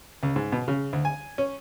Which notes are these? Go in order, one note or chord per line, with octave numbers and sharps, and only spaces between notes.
C#2
G#2
B2
C#3
D2
G#5
C#4